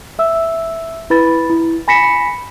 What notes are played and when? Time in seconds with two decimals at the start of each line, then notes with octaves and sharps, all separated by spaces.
0.19 E5 E6
1.10 E4 B4 B5 A6
1.50 E4
1.88 G#5 B5 A#6 B6 C#7 E7